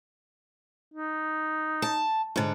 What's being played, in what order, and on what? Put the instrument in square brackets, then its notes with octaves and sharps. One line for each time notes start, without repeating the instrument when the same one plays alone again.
[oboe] D#4
[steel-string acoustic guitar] A5
G#2 D3